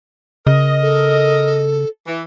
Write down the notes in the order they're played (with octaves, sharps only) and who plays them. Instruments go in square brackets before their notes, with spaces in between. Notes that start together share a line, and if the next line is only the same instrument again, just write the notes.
[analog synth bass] C#3 [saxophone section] A#4 D#5
[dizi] A4
[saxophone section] E3